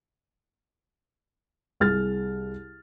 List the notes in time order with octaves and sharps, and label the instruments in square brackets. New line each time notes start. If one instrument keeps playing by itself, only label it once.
[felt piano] C2 G#4 F6 A6